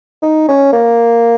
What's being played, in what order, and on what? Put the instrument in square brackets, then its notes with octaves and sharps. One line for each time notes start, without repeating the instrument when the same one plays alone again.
[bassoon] D#4
C#4
A#3